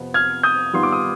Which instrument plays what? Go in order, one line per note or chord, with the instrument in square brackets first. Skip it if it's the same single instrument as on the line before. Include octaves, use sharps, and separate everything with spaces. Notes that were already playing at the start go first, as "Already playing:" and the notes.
Already playing: [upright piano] F2 C3 F3 B3
[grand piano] F6 G#6
D#6 G6
[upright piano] G#1 G#2 G3 B3 F4 [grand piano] C6
[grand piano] D6
D#6